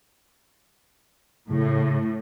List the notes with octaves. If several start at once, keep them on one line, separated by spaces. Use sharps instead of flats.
A2 C#3